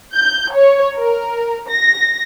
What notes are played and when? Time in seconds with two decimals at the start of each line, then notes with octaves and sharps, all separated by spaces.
0.14 G6
0.53 C#5
0.95 A#4
1.68 A#6